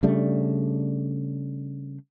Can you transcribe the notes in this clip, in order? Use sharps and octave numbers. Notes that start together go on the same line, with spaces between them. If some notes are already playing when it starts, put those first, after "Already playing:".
C#3 G3 A3 D4